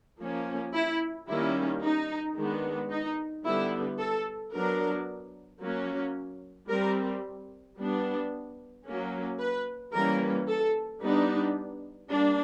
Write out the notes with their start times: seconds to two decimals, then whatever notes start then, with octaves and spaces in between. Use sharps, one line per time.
0.20 F3 A#3 C#4
0.74 E4
1.28 D#3 G3 A#3 C#4 E4
1.82 D#4
2.36 D#3 G#3 B3 D4
2.90 D#4
3.44 D3 G3 B3 E4
3.99 A4
4.52 F#3 B3 D4 A#4
5.60 F#3 A#3 C#4
6.69 G3 C4 A#4
7.77 G3 B3 D4
8.85 F#3 A#3 C#4
9.39 B4
9.94 E3 G3 A#3 C#4 A#4
10.48 A4
11.02 G3 B3 D4 D#4
12.10 G3 A#3 D4